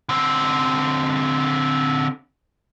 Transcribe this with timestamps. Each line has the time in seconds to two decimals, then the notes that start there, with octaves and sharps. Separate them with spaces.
0.09 D3 C4